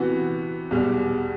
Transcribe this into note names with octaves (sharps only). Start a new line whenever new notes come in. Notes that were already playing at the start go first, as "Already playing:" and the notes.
Already playing: C3 E3 B3 F#4
E2 B2 G3